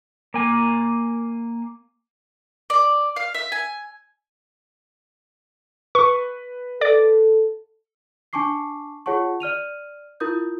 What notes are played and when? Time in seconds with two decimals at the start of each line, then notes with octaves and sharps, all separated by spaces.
0.34 A#3 G#5
2.70 D5
3.16 F5
3.34 E5
3.52 G#5
5.95 B4 C#6
6.81 A4 D5 D6
8.33 D4 G#5 A5 C#6 D6 C7
9.06 F4 G#4 C#5 F#5 A5 C#6
9.40 D5 F6 D#7 F7
10.20 E4 F4 A#4 D#6 G6